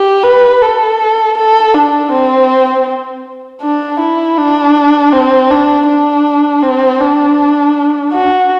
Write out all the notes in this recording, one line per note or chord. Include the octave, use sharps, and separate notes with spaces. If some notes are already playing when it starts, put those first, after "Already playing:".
Already playing: G4
B4
A4
A4
D4
C4
D4
E4
D4
C4
D4
D4
C4
D4
F#4